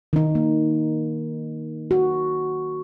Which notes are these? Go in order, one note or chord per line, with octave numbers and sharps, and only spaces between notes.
D#3 D#4
A#3
F#4